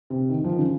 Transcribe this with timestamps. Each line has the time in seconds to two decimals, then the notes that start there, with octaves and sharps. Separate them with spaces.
0.10 C3
0.29 D#3
0.44 F3
0.52 D#3
0.58 C#3